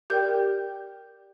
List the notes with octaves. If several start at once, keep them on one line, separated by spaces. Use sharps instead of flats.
G4 A#4 D5 G5 G6